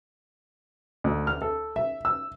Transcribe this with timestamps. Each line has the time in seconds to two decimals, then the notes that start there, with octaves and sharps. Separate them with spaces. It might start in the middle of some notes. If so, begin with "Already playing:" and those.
1.04 D2
1.27 F6
1.42 A4
1.76 E5
2.05 E6